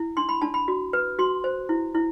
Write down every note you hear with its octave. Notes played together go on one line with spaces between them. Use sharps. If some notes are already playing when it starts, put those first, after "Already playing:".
Already playing: E4
D4 C6
B5
D4 A5
B5
F#4
B4
F#4 C6
C5
E4
E4